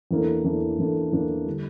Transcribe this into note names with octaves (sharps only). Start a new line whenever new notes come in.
E2 E3 A#3 D4 A4
E2 E3 A#3 D4 A4
E2 E3 A#3 D4 A4
E2 E3 A#3 D4 A4
D3 G3